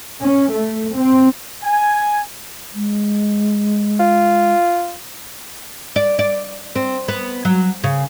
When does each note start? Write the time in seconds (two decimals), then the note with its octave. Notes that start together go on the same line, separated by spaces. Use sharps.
0.21 C#4
0.54 A3
0.93 C4
1.64 G#5
2.74 G#3
4.00 F4
5.96 D5
6.19 D5
6.76 C4
7.08 B3
7.45 F#3
7.84 C#3